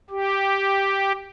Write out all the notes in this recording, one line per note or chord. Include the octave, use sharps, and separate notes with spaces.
G4